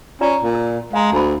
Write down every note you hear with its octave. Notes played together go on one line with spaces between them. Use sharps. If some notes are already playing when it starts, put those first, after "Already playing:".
C#4 F4 D5 A#5
A#2
A#4
G#3 F5 A#5
D2 A5 B5